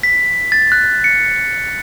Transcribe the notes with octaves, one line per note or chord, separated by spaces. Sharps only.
B6
A6
F#6
C#7